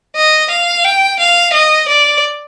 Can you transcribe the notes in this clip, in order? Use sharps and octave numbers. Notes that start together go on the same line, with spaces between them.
D#5
F5
G5
F5
D#5
D5